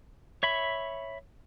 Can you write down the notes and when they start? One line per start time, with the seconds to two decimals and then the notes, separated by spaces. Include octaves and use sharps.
0.43 C#5 E5 B5